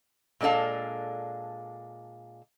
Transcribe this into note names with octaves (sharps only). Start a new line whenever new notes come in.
A#2 G#3 D4 A4 F5